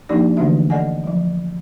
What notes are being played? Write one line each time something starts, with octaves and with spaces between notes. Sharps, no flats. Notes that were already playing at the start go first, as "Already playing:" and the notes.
F3 A#3 D4 D#4 G4 D5
D3 E3 A3 D4 F#4 E5
A4 D5 D#5 F#5 G#5
F3 F#3